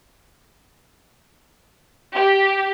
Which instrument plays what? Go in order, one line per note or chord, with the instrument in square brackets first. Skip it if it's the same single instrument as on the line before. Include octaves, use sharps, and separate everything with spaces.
[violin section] G4